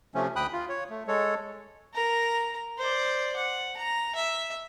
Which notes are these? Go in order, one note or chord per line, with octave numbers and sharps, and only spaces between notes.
C3 F3 A3 C#4
D2 G5 B5 D#6 F#6
F4
C#5
A3
G#3 A4 C#5
A#4 A#5
C5 D5
F#5
A#5
E5